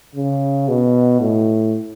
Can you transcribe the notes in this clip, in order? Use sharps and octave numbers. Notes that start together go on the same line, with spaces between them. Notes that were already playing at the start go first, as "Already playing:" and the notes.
C#3
B2
A2